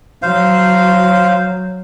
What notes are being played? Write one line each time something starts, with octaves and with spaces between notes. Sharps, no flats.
F#3 C5 F5